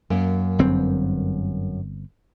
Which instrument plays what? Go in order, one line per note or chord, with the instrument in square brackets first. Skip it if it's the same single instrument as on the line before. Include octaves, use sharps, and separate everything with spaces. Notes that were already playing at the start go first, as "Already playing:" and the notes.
[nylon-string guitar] F#2 A#3
[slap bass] G1 G2 C4